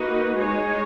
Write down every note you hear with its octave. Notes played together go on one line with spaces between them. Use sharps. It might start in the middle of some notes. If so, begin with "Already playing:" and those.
Already playing: A#3 D#4 F#4 B4
G#3 D#4 G#4 C#5